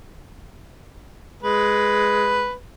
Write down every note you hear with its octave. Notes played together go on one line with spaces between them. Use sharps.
G#3 B4